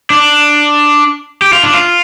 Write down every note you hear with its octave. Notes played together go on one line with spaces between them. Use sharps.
D4
G4
F4
D4
F4